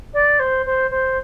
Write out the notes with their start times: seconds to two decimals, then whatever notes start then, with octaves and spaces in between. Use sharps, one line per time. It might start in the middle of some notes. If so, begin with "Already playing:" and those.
0.14 D5
0.40 C5
0.66 C5
0.91 C5